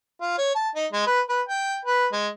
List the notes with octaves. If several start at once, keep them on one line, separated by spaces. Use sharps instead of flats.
F4
C#5
A5
D#4
G#3
B4
B4
G5
B4
G#3